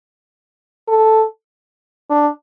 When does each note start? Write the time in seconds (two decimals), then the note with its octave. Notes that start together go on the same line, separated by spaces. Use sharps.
0.88 A4
2.10 D4